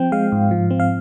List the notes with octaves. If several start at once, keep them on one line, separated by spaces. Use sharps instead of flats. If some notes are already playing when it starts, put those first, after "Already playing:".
Already playing: F3 C4 G5
G#3 F5
G#2
F3
C4
F5